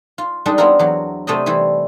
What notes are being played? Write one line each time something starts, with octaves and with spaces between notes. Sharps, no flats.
F4
G3 G#3 D4 D#4 A4 A#4
B3 C4 E4 F4 A#4
E2 F#3
C3 A3 C5 D5 D#5
E3 G3 E4 C5